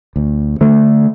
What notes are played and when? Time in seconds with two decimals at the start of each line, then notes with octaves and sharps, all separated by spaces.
0.16 D2
0.61 D3 A3